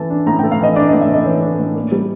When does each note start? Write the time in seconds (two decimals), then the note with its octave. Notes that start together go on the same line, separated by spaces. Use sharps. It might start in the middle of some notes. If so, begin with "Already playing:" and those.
Already playing: E3 A3 A5
0.10 D4
0.27 A2 A#5
0.39 A3 G5
0.52 F5
0.60 E3 D#5
0.76 D4 D5
0.89 A2 D#5
1.01 E5
1.10 A3 D#5
1.26 E3 C#5
1.42 D4
1.59 A2
1.76 A#3
1.92 G3